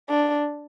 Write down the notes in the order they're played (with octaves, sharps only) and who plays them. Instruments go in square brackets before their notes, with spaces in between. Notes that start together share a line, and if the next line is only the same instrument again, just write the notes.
[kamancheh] D4